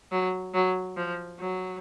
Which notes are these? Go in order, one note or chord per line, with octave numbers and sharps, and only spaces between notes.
F#3
F#3
F3
F#3